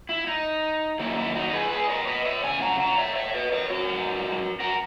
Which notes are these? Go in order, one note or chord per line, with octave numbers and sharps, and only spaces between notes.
E4
D#4
F#2 D#3 F#3 A#3 E4
E4
D#4 F#4
G#4 B4
G#4 B4
D#5
A#4 C#5
B4 D#5
C#5 E5
E2 C#3 G#5
F#5 A#5
F#5 A#5
C#5 E5
C#5 E5
B4 D#5
A#4 C#5
F#4 A#4
G#2 F#3 B3
F#4 A#4